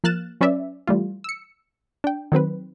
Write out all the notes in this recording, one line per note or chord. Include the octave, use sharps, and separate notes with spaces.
F3 A#3 F6 F#6 A6 E7
F#3 C#4 B4 D5 E5
E3 G3 A3 F4
E6 C#7
D4 G5
D#3 F#3 C4 B4